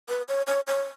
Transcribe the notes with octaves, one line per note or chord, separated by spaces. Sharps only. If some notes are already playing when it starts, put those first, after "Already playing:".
B4
C#5
C#5
C#5